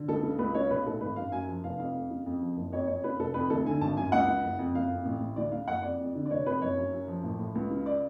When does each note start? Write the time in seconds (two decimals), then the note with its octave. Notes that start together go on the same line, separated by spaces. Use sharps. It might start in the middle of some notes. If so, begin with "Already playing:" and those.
Already playing: D3
0.08 C#2 A4
0.23 C#3
0.39 C#2 B4
0.54 C#3 C#5
0.70 B1 B4
0.86 A2 A4
1.01 G#1 B4
1.16 F#2 F5
1.32 F#2 G#5
1.47 F3
1.64 F1 F5
1.78 F2 F5
1.94 F2
2.10 C#3
2.26 F2
2.41 F3
2.57 F#1
2.72 F2 C#5
2.87 F2 C#5
3.04 C#3 B4
3.19 F1 A4
3.34 F2 B4
3.50 D2 A4
3.66 D3 G#5
3.81 G#1 A5
3.97 F#2 G#5
4.12 C#2 F#5
4.28 C#3
4.43 F#1
4.58 F2
4.75 F#1 F5
4.90 F2
5.05 A1
5.21 A2
5.36 D2 D5
5.52 C#3 F5
5.68 F#1 F#5
5.83 F2 D5
6.00 F2
6.15 D3
6.26 D5
6.30 F1 C#5
6.46 F2 B4
6.61 F#1 C#5
6.77 F#2
6.93 F#2
7.08 F3
7.23 A1
7.39 A2
7.55 C#2
7.71 C#3
7.86 D5